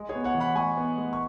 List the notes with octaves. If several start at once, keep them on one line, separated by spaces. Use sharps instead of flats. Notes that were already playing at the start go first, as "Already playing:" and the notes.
Already playing: G#3
G#4 C#5
B3
C#5 F#5
E3
F#5 B5
G#3 G#5 C#6
B3
G#3
C#6